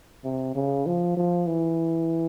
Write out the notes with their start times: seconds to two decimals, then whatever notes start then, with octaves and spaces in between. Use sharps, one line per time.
0.25 C3
0.55 C#3
0.86 F3
1.17 F3
1.47 E3